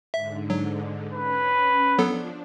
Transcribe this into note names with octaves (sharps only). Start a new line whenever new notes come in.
G#2 D3 E5
F#3
C#4 B4
F3 F#3 B3 D4 A4